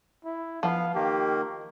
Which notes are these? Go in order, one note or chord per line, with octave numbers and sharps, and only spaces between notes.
E4
F3 B3 F5
D#3 A#3 G4